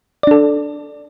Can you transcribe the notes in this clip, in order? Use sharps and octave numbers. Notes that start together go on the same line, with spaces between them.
D4 A4 D5